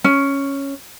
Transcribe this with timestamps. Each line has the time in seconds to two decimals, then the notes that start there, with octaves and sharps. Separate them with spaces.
0.04 C#4